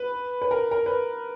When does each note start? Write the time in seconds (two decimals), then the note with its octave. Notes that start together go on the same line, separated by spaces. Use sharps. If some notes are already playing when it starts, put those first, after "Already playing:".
Already playing: B4
0.42 B4
0.51 A#4
0.71 A#4
0.86 B4